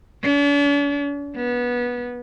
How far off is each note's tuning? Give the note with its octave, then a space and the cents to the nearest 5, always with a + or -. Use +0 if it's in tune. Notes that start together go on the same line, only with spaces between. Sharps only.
D4 -45
B3 -20